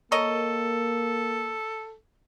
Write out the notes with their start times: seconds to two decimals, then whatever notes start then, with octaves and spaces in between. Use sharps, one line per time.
0.12 A#3 A4 A#4 C#5 D#5